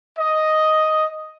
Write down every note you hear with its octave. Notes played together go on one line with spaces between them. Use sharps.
D#5